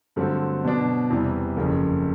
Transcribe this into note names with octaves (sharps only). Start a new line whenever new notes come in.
G2 D3 F#3 A3 C4
B2 F#3 B3 D4
E2 C3 E3 G3
F#1 F2 C#3